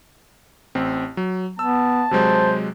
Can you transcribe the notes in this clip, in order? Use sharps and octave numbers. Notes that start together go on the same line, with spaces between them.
A1 C4
F#3
B3 A5 E6
C3 F#3 G#3 C5